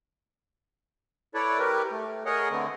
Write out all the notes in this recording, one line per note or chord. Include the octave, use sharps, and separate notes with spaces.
E4 A4 B4 C#5 D5
G3 G4 A#4 B4
A3
G#4 A#4 C#5 D#5 F#5
D3 A3 B3 C4